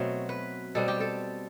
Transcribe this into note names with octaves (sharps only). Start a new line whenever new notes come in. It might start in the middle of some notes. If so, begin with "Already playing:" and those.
Already playing: B2 F#3 A3 C4
B4
B2 G3 C4 A4
G4
A4